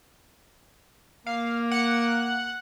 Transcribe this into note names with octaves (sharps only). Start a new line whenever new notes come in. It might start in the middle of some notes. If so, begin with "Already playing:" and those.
A#3 F5
F#5